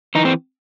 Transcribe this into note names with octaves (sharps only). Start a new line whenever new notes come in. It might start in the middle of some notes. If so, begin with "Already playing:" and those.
E3 D#4
C4